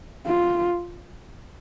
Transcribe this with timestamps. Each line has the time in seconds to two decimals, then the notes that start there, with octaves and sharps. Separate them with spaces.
0.26 F4